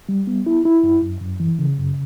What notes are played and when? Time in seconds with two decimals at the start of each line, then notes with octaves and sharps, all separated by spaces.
0.09 G3
0.27 B3
0.46 E4
0.65 E4
0.83 F#2
1.02 F#2
1.21 F#2
1.40 E3
1.59 C#3
1.78 F#2